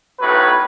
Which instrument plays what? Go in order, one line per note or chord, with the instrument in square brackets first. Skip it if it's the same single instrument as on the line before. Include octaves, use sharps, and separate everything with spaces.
[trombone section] B1 A2 F#3 B4